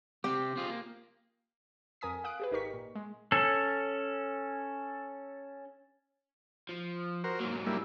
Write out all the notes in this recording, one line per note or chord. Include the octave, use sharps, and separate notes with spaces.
C3 C4 G4
C4 F4 G#4
A#3
F2 A#4 G#5 D#6 B6
F5 D#6 F#6 D7
G4 G#4 B4
G#1 D#4 G4 A#4 C#6 B6
A#2
G#3
C#4 A4
F3
F#4 A#4 C5
G#2 F#3 A#3
G3 A#3 E4